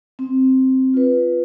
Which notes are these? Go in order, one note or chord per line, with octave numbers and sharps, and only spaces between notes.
C4
F4 B4